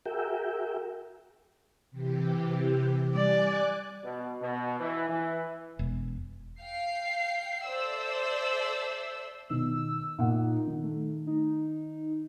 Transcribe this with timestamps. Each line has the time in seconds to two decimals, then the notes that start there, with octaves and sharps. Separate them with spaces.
0.06 F#4 G#4 A#4 E5 G5
1.91 C3 E3 G4
3.15 G3 D5 G#5 D6 F#6
4.04 B2
4.41 B2
4.80 E3
5.09 E3
5.79 E1
6.60 F5 G5 C7
7.64 A4 C5 D5 E5 E6
9.50 B2 D#3 E6
10.19 A#2 D#4 F#5
10.67 D#3
10.84 A3
11.27 D#4